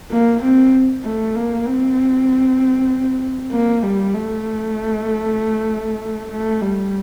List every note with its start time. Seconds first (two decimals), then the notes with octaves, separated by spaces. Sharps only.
0.11 A#3
0.42 C4
1.04 A3
1.35 A#3
1.66 C4
3.51 A#3
3.83 G3
4.14 A3
6.31 A3
6.62 G3